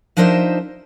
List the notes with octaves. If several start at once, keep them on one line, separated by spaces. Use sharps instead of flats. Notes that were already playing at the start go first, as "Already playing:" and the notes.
F3 D4 D#4 A#4 C5 E5